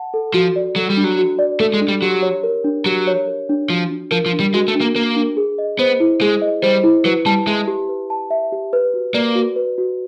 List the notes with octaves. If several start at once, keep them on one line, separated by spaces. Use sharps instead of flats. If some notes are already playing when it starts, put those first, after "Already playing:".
Already playing: F#5 A5
A4
F3 F#4
D5
F#3 A4
G3
D4
F#3
F#4
D5
A3 A4
G#3
D4
G3
F#3 G4
C#5
A#4
D4
F#3 G4
C#5
A#4
D4
F3 F#4
D4
F3 A#4
F3
D4
G3
G#3 F#4
A3
D4
A#3
A#3 A#4
D4
G#4
D#5
B3 C5
E4
G#3 G#4
D#5
G3 C5
E4
F#3 B4
G3 A5
G#3 E5
G4
B4
A5
E5
G4
B4
F#4
A#3 D5
F#4
B4
F#4